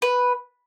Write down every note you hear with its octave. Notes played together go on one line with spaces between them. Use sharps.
B4